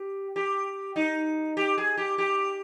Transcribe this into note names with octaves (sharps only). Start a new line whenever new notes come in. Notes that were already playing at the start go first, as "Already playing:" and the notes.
Already playing: G4
G4
D#4
G4
G#4
G4
G4